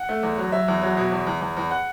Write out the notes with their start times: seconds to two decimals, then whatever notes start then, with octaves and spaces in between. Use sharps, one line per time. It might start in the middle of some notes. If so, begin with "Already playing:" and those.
Already playing: F#5
0.09 A3
0.23 E2
0.38 F#3
0.52 F#3 E5
0.68 E2
0.82 F#3
0.97 B2
1.12 E2
1.27 E2
1.41 E2
1.57 E2
1.71 F#5